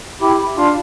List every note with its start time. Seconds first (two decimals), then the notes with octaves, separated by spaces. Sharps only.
0.21 E4 G4
0.57 D4 F4